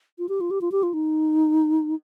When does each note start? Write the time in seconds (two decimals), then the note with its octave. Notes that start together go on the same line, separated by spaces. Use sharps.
0.19 F4
0.29 G4
0.41 F4
0.51 G4
0.61 F4
0.72 G4
0.83 F4
0.94 D#4